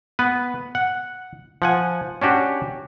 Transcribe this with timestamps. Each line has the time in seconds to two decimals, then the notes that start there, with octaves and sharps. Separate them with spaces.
0.19 B3 B4
0.75 F#5
1.62 F3 F#5 G#5
2.22 C#4 D4 F#4 G4